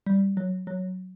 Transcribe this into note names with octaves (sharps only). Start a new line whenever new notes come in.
G3
F#3
F#3